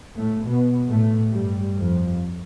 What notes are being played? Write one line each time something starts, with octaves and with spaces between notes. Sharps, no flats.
A2 A3
B2 B3
A2 A3
G2 G3
F2 F3